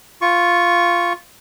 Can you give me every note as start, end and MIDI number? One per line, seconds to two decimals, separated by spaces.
0.21 1.13 65
0.21 1.13 85